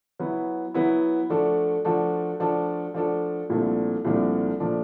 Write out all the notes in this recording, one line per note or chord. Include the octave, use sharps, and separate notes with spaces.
F#3 B3 E4
F#3 B3 E4
F3 A3 D4 F#4 A4
F3 A3 D4 F#4 A4
F3 A3 D4 F#4 A4
F3 A3 D4 F#4 A4
C2 A#2 F3 A3 D4
C2 A#2 F3 A3 D4
A#2 F3 A3 D4